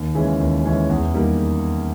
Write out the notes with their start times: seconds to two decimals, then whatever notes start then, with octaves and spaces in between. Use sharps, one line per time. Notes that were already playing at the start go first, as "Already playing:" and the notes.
Already playing: D#2
0.15 C#3 E3 G#3 C#4
0.40 D#2
0.64 C#3 E3 G#3 C#4
0.90 E2
1.14 D#3 G3 A#3